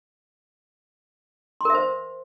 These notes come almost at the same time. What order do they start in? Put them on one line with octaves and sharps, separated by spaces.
C6 A#4 E5 C5